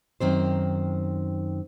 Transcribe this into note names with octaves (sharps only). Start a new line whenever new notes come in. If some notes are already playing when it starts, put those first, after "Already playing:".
F#2 D#3 C4 C5